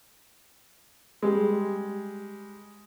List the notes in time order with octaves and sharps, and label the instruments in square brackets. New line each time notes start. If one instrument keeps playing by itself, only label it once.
[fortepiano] G3 G#3